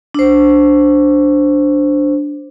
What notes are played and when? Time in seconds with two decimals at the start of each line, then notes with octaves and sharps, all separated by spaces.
0.14 D4 C5